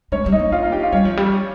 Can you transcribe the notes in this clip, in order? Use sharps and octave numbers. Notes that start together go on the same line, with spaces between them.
G#3 C#4 C#5
G3
D#4 D#5
A#3
F4 F5
D#4 D#5
G4 G5
F4 F5
G3 C#4 C#5
F3
G3